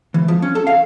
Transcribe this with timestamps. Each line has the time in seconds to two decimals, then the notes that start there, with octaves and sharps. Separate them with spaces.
0.14 E3
0.28 F3
0.42 C#4
0.55 A4
0.67 F5